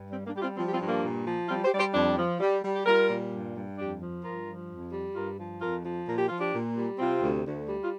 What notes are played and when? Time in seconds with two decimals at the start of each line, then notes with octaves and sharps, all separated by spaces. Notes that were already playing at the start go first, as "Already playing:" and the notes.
Already playing: G2
0.11 G3 C4
0.26 A#3 D4
0.34 G3 G4
0.41 C4 F4
0.57 F3 C4 F4
0.66 G4
0.73 C4 F4
0.80 G2
0.87 A#3 D4
1.03 A#2
1.26 F3
1.48 G3 C4 F4
1.64 G4 C5
1.71 G3 D5
1.79 G4 C5
1.94 F2 D4 G4
2.17 F3
2.40 G3
2.63 G3
2.75 G4
2.86 G3 F4 A#4
3.09 A#2
3.32 G2
3.55 G2
3.78 F2 D4 G4
4.01 F3
4.23 G2 F4 A#4
4.47 F3
4.69 F2
4.92 G3
5.15 G2 F4 A#4
5.38 F3
5.61 F2 F4 A#4
5.84 F3
6.07 A#2 A#4
6.17 G4
6.28 F3 F4
6.38 D4 G4
6.53 A#2
6.76 G3
6.99 C3 C4 F4
7.22 D2
7.45 D2
7.68 G3
7.83 F4